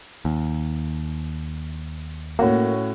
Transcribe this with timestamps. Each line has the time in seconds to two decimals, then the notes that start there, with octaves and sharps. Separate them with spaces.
0.25 D#2
2.39 A2 A#3 C#4 F#4